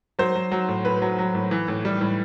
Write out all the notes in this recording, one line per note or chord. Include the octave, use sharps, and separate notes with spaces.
F#3 C5
F#3
F#3
A2
A2 B4
F#3
F#3
A2
E3
A2
G3
A2